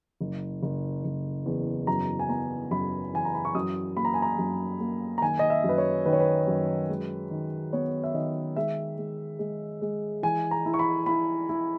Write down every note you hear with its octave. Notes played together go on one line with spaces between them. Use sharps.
F#1
F#1
F#1
E2
F#2 A#5
G#5
B3 A#5
F#2 B5
E3 G#5
A#5
B5
C#6
F#2 D#6
A#3 B5
A#5
G#5
A#5
F#2
A#3
A#5
D#3 G#5
D#5
E5
F#2 B4
C#5
D#3 B4
C#5
B4
F#2
G#3
D#3
B3 C#5
E5
D#3 D#5
G#3 E5
G#3
G#3
G#3
E3 G#5
A#5
E4
C#6
B5
E4 B5
E4